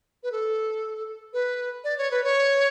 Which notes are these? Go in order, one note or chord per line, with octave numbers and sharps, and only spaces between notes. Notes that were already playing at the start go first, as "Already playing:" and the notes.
B4
A4
B4
D5
C#5
B4
C#5